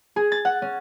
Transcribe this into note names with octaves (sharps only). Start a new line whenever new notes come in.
G#4
A6
F#5
C#4